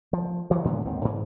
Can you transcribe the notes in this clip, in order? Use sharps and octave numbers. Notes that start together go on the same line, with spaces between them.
F3
G2 E3 F#3
A2 D3 G#3 B3
D#2 G#2 D#3 C4
G#2 E3